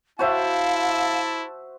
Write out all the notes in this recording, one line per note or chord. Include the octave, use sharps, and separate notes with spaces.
E4 F#4 C5 E5 F5 A5